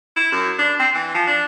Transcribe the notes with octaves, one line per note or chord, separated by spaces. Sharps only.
E4
F#2
D4
C4
E3
F3
D4